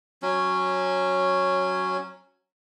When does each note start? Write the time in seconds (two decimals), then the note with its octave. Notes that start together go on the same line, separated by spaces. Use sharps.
0.22 F#3 C#4